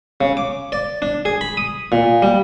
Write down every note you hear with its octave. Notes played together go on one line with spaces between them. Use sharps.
C#3
D6
D5
D4
G#4
B5
D#6
A#2
G3